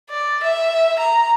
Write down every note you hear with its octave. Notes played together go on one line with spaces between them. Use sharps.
D5
E5
A#5